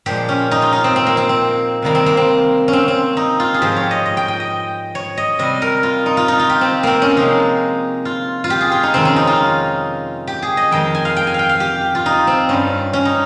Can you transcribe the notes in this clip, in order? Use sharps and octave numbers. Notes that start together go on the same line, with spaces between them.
A#2 F3 G#3 G4
C#4
D#4
F4
D#4
C4
C4
A#3
C4
C4
C3 D#3 G3 A#3
C4
A#3
C4
C#4
C4
C4
D#4
F4
G#4
G#2 F3 G#3 G4
C#5
D#5
D#5
G5
G5
D#5
C#5
D#5
C3 G3 D#5
A#4
F4
D#4
F4
D#4
F4
G4
C4
A#3 C4
C#4
C3 F3 G#3 D#4
F4
F4
G4
G#4
F4
D#4
F2 C3 D#3 G#3 C4
C#4
D#4
F4
G4
G#4
D#5
F2 D#3 G#3 G5
G#5
F5
G5
G#5
F5 G5
F5
G4
F4
D#4
C4
G2 G3 C#4
C#4
D#4